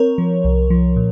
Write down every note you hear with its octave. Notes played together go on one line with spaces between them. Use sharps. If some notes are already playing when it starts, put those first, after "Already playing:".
Already playing: C4 A#4 C#5
F3
C2
F3
A#2